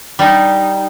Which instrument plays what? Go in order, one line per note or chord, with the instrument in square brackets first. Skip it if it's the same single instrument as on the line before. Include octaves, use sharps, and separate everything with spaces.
[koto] G3 D#4